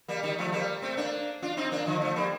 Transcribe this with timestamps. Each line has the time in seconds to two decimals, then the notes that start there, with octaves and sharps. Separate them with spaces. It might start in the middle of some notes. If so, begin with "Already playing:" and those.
0.08 G3 A#3
0.23 D#3 G3
0.38 F3 A3
0.52 G3 A#3
0.82 A3 C4
0.97 A#3 D4
1.42 D4 F4
1.57 C4 D#4
1.72 A#3 D4
1.86 D3 F3
2.02 F3 A3
2.16 G3 A#3